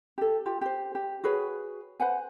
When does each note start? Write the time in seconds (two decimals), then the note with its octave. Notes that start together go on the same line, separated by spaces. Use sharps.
0.18 G4 A4
0.46 F4 G4
0.61 G4 C5
0.95 G4
1.24 F#4 G#4 B4 C#5
2.00 B4 C5 F#5 G#5